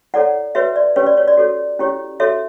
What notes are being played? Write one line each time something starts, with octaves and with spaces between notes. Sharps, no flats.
E4 A4 C#5 D5 F#5
F#4 B4 C#5 E5
D5
C#4 G4 B4 C#5
D5
C#5
D5
F#4 A4 C#5
C#4 E4 G4 C#5
F#4 A4 C#5 E5